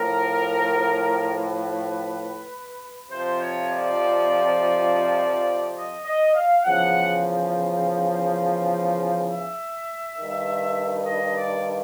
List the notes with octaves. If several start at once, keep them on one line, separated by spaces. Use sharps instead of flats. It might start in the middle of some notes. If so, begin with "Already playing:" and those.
Already playing: A2 F3 A#4
B4
F2 C3 F3 C5
C#5
D5
D#5
D#5
F5
E2 C#3 F3 F#5
E5
G2 D#3
D#5
D5